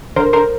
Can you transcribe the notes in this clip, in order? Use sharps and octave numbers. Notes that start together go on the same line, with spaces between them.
D3 A#4 C5
D3 A#4 C5